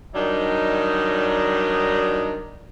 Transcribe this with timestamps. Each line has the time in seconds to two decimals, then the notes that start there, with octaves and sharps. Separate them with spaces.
0.14 D#3 F#3 G3 D4 D#4